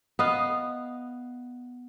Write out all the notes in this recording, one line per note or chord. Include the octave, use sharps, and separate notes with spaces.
B3 D#5 F5